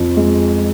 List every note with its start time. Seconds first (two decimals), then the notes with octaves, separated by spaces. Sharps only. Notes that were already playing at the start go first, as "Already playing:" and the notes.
Already playing: F2 F3
0.17 G#3